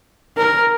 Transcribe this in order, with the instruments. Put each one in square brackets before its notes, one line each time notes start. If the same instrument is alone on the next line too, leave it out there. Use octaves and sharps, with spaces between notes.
[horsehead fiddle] A#4